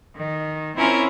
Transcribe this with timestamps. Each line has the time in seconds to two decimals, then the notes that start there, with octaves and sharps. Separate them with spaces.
0.15 D#3
0.77 C4 C#4 E4 F4 A#4